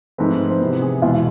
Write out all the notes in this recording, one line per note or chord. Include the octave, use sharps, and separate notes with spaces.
G#2 F3 A3 C4 B4
C5
C3 E3 B3 B4
G#4
E2 B2 G#3 F4